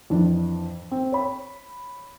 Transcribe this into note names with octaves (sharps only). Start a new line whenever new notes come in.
F2 E3 D4
C4
C#5 B5